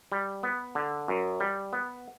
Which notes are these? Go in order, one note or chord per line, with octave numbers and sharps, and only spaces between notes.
G3
B3
D3
F#2
G3
B3